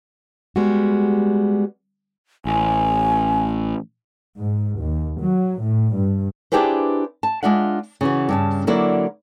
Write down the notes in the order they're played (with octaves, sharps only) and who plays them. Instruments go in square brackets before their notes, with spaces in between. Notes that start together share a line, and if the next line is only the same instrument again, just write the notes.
[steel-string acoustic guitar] G3 G#3 B3 F#4
[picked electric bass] A1 [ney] G#5
[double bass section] G#2
D#2
F#3
A2
G2
[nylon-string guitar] D4 E4 G4 G#4 B4 C5
A5
G#3 D4 F4 E5 F#5
C#3 E3 F#4
G2 C#3 A5
D3 F#3 A#3 E4 F#4 D5